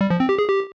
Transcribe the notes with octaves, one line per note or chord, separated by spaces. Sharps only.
G3
F3
C4
G4
G#4
G4